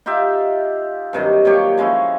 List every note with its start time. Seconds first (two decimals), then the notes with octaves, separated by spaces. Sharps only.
0.06 D#4 F4 G4 E5
1.13 G2 C3 D#3 F#3
1.45 A#2 F#3 G4 C#5
1.77 F3 G#3 C#4 E4